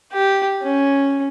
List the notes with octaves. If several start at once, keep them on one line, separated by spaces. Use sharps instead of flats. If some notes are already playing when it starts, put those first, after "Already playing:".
G4
C#4